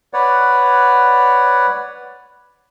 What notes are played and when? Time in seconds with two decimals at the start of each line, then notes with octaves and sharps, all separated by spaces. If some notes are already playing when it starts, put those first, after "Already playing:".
0.13 B4 C#5 D5 F#5